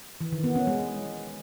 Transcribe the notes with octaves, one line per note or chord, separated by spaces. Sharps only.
E3
D#3
B3
C#4
G#3